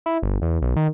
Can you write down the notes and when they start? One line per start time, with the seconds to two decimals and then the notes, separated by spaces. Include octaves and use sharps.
0.06 E4
0.23 G1
0.42 E2
0.62 B1
0.76 D#3